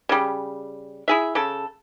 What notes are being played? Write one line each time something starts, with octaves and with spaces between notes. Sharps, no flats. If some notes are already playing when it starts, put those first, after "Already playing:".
C#3 G3
E4 G#4 E5
C#3 A4